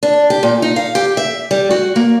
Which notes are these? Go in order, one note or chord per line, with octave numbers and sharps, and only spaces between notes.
D4
G4
A#2
D#4
F5
G4
E5
G3
F#4
A#3